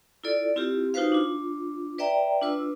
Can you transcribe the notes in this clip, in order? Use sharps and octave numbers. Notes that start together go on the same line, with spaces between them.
E4 F4 A4 D5
C4 E4 F4 G4
D#4 F4 F#4 B4 C5 F5
D4 F4
B4 D5 E5 G5 A#5
D4 F4 B4 E6